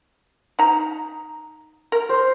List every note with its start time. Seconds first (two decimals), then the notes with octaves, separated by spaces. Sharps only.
0.59 D#4 A#5
1.92 A#4
2.09 C5